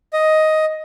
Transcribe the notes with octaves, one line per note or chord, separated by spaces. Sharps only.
D#5